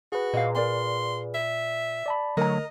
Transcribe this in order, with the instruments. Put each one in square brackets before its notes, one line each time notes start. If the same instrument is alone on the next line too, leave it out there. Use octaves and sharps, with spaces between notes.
[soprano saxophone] F#4 [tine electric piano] G#4 B4
[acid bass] A#2 [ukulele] D#5 F5
[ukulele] A#4 D5 F5 [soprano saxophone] C6
[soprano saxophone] E5
[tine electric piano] D5 A5 B5
[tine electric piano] D3 A3 [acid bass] F#3 [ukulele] A#4 A#5 [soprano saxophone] D#5